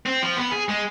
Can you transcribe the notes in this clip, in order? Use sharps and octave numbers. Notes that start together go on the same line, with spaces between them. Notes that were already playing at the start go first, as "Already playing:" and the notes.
C4
F3
B3
G#4
G#3